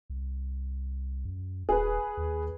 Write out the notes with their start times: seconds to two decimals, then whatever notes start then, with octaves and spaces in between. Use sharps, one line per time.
0.10 C2
1.25 F#2
1.69 D#1 G#4 B4
2.17 D#2